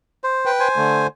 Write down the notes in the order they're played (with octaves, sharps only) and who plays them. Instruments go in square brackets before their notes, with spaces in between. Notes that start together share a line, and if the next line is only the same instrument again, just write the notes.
[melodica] C5
[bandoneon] B4 G5
[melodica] C5 G#5
[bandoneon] D3 A3